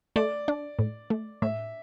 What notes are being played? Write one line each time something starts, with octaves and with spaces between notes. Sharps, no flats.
A3 D5
D4
A2
A3
A2 E5